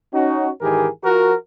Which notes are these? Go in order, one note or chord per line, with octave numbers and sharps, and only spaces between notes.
C#4 D#4 F#4
G#2 D#3 E3 G4 G#4 A#4
F3 F#4 A#4